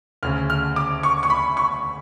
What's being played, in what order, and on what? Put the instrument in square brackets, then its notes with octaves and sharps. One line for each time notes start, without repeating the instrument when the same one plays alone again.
[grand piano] D2 C#3 F6
F6
D6
C#6
C#6
B5
C#6